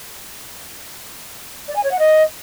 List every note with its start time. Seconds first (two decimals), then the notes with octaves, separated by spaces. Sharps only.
1.68 D5
1.76 G#5
1.84 C#5
1.91 F#5
1.99 D#5